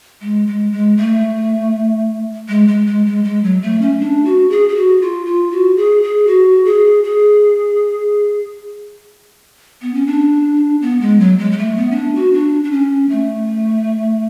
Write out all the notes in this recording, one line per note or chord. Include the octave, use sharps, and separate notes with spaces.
G#3
G#3
G#3
A3
G#3
G#3
G#3
G#3
G#3
F#3
A3
C#4
D4
F#4
G#4
G#4
F#4
F4
F4
F#4
G#4
G#4
F#4
G#4
G#4
B3
C#4
D4
B3
G#3
F#3
G#3
G#3
A3
B3
C#4
D4
F#4
D4
D4
C#4
A3